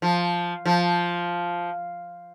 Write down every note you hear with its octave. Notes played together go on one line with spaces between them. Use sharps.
F3
F3